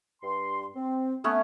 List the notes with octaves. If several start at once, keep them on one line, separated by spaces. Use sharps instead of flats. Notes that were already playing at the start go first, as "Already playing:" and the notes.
G2 C6
C4
A3 B3 C#4